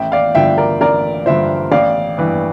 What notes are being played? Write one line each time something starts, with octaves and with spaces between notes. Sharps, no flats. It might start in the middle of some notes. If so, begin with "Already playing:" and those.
Already playing: A1 E5 G5
D5 F5
G2 D3 F3 E5 G5
A#4 D5
A1 A#4 D5
G2 D3 F3 C5 E5
A1 D5 F5
G2 E3